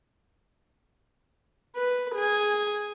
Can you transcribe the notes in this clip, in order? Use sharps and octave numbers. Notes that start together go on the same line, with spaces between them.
B4
G#4 G#5